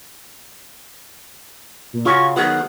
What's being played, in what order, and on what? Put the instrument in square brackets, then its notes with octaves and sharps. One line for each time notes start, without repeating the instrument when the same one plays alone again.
[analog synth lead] A#2
[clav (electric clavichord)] C#3 C#4 F#4 [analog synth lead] F4 [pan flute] C#6
[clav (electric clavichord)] D#3 F#3 B3 [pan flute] G#4 [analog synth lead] F#5